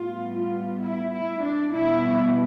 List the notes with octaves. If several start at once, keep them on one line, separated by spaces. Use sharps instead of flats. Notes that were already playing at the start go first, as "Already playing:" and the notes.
Already playing: A2 G3 B3 F4
F4
E4
E4
D4
B2 G3 B3 E4